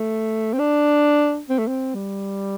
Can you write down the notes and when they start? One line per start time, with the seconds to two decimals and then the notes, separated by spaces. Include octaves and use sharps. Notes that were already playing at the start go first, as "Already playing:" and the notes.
Already playing: A3
0.53 C4
0.59 D4
1.49 C4
1.59 A3
1.68 C4
1.95 G3